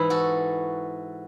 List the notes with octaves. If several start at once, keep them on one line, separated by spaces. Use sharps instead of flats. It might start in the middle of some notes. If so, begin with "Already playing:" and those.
Already playing: G#2 E3 E4
F#4 A4